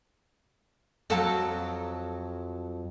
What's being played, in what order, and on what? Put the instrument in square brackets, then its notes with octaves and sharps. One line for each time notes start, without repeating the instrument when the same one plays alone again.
[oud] F2 F#3 A4